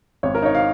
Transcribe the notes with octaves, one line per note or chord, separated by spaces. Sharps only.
G#1 C#5
A#4
D#4 C#5
F5